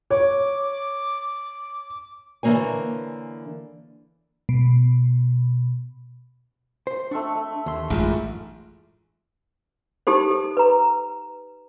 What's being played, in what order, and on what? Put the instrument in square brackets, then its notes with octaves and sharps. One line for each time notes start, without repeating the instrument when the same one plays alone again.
[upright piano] C#5 [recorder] D6
[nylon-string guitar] D3 E3 F3 A#3 C#5 G#5
[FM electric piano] B2
[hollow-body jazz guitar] C5
[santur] A3 C4 C#6 [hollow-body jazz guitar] D4
[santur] A3
[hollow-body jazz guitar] D#2 C6 [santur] E5
[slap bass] A1 F#2 [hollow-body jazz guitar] G#3 D#4 F4
[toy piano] D#4 G4 A4 C5
A4
B4 A#5